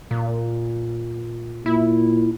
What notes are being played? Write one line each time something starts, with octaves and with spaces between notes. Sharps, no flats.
A#2
A#2 E4